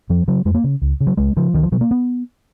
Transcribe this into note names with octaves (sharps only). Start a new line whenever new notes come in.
F2 F3
C#3 F#3
F2 G#3
A#3
C#3
C#2
C#3
F#3
C#2 G#3
C#3 F3
C#2 D#3
F3
B2 F#3
A#3
B3